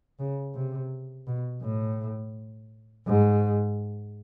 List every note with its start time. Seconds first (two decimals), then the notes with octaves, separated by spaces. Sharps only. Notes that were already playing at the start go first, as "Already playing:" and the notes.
0.19 C#3
0.55 C3
1.27 B2
1.62 A2
3.07 G#2